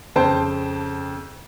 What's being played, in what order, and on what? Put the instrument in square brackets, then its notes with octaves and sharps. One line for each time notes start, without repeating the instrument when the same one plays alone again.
[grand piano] F2 C#3 C5 G5 A5